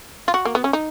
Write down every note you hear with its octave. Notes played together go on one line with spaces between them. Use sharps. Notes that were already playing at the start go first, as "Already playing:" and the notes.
F4
F#4
A#3
B3
C#4
D#4